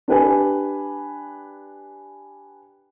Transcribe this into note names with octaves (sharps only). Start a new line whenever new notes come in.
D4 G4 B4 G#5